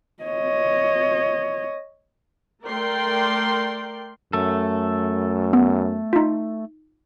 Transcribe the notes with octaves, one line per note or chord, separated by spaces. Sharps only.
C#5 D#5
A3 A#4 D5 G5 C6
F#2 A3 A4
B3
D#4 F4